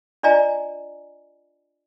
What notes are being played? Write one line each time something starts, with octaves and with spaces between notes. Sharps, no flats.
D4 F4 D5 D#5 G#5 A#5